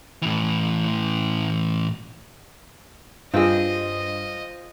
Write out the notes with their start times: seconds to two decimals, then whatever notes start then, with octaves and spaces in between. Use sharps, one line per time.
0.22 A2 E3
3.34 G2 C4 F4 G#4 D#5